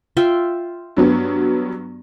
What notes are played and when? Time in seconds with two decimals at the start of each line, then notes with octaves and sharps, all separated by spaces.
0.17 F4 E5 G5
0.97 G2 F#3 B3